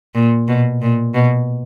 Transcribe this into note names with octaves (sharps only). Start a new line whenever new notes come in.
A#2
B2
A#2
B2